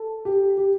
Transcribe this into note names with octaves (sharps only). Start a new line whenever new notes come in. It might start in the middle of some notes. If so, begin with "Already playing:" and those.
Already playing: A4
G4
G4